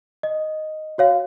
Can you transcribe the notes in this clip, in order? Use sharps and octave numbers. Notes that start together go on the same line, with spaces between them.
D#5
F#4 C#5 F5